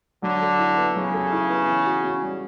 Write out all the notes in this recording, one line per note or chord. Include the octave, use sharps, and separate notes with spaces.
D3 F#3
A4
E4
B3
C#3 F#3
A4
E4
B3
E3
F#4
C#4
G3